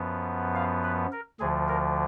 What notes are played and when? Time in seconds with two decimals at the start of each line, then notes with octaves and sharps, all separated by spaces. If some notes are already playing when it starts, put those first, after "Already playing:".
Already playing: F#2 F3 B3
0.55 F5
0.84 B4
1.12 A#4
1.40 D2 D3 F3 G#4
1.68 A#4